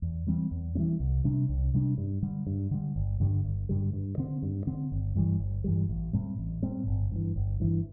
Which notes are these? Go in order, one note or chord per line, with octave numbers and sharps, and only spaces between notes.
E2
E3 G3 C4
E2
E3 G3 C4
C2
C3 G3 D4
C2
C3 G3 D4
G2
D3 G3
G2
D3 G3
G1
G2 D3 G3
G1
G2 D3 G3
G2
D3 C4
G2
D3 C4
G1
G2 E3 G3
G1
G2 E3 G3
A1
A2 G3 C4
A1
A2 G3 C4
G1
G2 E3
G1
G2 E3